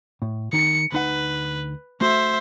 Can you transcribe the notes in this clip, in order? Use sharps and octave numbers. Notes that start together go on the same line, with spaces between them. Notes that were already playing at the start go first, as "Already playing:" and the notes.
A2
D#3 D#4 C#7
D2 D#4 B4 F#5
A3 F#4 C5 E5